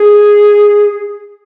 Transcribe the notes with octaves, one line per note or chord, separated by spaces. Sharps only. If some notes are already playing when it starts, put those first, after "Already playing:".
Already playing: G#4